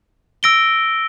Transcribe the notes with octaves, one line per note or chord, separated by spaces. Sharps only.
E6 A#6 D7 G7